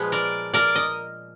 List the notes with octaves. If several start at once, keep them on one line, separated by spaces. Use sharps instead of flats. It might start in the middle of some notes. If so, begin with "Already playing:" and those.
Already playing: A#2 F3 G#3 B3
A#4 D5
A#4 D5
D#5